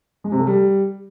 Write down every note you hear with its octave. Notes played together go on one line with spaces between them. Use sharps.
G#3
C3
A3
G3